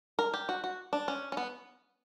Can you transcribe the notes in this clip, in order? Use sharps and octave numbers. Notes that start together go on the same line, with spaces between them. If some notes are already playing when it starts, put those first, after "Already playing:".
A#4
G4
F#4
F#4
D4
C#4
C#4
B3